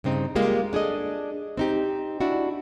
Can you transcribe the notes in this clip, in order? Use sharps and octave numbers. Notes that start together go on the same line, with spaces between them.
G2 C#3 C4 D#4
G3 G#3 A#3 F4 G4
D4 G#4 A4 D#5
C4 D#4 G4
D4 E4 F#4